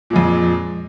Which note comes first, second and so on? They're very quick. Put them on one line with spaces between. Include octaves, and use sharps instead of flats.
A#2 G#3 F2